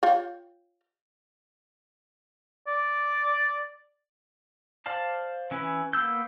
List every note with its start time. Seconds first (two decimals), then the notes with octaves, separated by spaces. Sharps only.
0.03 F4 C#5 G5
2.67 D5
4.86 C5 D5 F5 A5
5.51 E3 C#4 E4 B4
5.93 A#3 B3 E6 G6